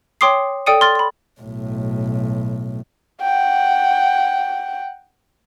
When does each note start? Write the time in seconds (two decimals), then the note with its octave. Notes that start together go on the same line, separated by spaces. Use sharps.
0.21 C#5 G5 C6 D6 D#6 C7
0.66 A4 D5 G5 D#6 C#7 D#7
0.81 C6 F6 A6
0.95 B5 C6
1.41 B1 A2
3.21 F#5 G5